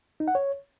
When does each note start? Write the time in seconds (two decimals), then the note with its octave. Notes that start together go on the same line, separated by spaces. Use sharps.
0.20 D#4
0.28 F#5
0.35 C#5